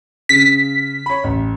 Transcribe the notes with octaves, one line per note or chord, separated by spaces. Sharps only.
C#3 B6
C#5 B5
A1